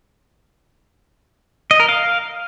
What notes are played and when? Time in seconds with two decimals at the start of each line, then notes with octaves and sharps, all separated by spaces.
1.71 D#5
1.80 A#4
1.89 F5